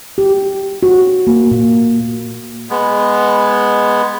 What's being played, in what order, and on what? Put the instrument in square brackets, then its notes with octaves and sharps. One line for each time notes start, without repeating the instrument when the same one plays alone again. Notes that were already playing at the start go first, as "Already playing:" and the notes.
[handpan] G4
F#4
A#3
A#2
[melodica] G#3 B3